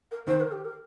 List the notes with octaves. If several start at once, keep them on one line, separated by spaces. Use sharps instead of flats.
A#4
D#3 C5
A#4
G4
A#4